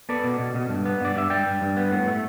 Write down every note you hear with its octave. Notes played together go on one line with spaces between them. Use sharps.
B3 A4 D5
B2
B2
B2
G2
B3
G2 D5
G2 E5
G2 D5 G5
G2
G2
B3
A2
A3